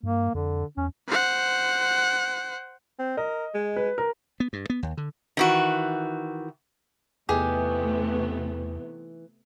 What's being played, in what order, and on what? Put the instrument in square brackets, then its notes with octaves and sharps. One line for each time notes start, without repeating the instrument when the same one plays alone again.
[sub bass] G2 [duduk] A#3
[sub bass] F2 [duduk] D3
[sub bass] E2 [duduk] C#4
[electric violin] C5 F#5
[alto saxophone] C4
[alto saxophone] A#4 [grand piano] D#5
[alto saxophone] G#3
[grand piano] B4
A#4
[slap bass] B3
G2
B3
D#2
D3
[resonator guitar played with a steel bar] D#3 E3 F#4
[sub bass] E2 [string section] C3 A3 B3 [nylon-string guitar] E3 D#4 [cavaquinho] G4 G#4